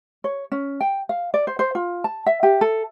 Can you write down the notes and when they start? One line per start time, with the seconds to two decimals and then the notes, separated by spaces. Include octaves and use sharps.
0.24 C#5
0.52 C#4
0.81 G5
1.09 F5
1.34 D5
1.47 C5
1.59 C5
1.75 F4
2.04 A5
2.26 E5
2.43 G4
2.61 A4